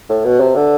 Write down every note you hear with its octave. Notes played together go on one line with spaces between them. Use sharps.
A2
B2
C3
D3